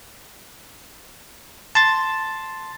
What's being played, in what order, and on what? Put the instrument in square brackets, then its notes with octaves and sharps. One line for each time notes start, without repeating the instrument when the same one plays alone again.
[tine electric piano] A5 C6 A6